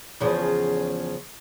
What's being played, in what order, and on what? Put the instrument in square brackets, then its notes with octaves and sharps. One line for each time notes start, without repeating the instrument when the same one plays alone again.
[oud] E2 C#3 F3